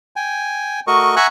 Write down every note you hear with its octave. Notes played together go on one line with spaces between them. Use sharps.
G5 G#5
A3 F#4 A#4 D#5 C#6
E5 F#5 G#5 A#5 C#6 F#6